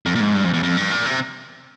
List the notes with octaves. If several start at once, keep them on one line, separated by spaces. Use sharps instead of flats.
F2
A#2
G#2
G2
F2
E2
F2
G2
A#2
C3